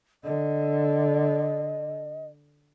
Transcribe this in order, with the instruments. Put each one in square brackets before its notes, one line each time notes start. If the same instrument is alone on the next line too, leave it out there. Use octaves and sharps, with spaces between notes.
[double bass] D3 [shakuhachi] D#5